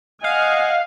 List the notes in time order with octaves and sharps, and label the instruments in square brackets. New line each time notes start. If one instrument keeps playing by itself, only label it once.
[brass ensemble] D#5 [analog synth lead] F5 [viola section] F#5 G#5